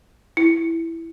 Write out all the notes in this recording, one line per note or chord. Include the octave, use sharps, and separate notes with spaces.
E4